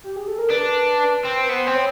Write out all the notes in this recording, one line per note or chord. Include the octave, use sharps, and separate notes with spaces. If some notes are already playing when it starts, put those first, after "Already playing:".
G4
G#4
A4
A#4
D4 B4
B4
C4
B4
B3 C5
C4
C#5